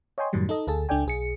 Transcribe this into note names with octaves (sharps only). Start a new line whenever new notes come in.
C#5 D#5 G5 G#5 C6
F#2 A2 D#3 F#3 G3
D#4 A4 D#5
D2 G#4 A4 A5
C#2 D4 A4 D5 G5 G#5
B1 G#4 C#7